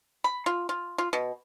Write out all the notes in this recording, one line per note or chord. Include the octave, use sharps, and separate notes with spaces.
B5
F4
F4
F4
B2